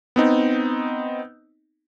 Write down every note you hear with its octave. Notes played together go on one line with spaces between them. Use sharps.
B3 C4 D#4